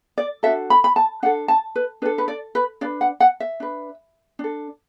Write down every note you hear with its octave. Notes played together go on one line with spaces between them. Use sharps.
D5
D4 F#4 A4 E5
B5
B5
A5
D4 A4 F#5
A5
B4
D4 A4 B4
B4
D5
B4
D4 B4 D5
F#5
F#5
E5
D4 B4
D4 A4